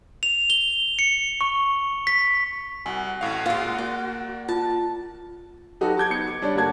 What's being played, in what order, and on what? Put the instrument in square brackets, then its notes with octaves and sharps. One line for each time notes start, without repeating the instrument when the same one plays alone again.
[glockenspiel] F7
G7
C#7
C#6
B6
[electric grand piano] C2 [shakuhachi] F#4 [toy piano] G#5
[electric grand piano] A1 A2 F5
[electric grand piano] A#2 F5 [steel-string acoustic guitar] G#3 F4
[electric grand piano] A#3 [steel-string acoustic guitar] D5
[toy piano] F4 [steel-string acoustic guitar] A5
[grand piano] F#3 D#4 F#4 G4 A4 B4
A5 D6 G6 G#6
B3 D#4 C#7
D6
G3 D4 C#5 D5
G1 A#3 F#4 A5 G#6